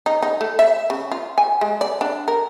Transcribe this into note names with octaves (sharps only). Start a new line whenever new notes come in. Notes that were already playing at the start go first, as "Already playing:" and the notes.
D#4
D#4
A3
E5
C#3
F4
G#5
G#3
D5
D4
A#4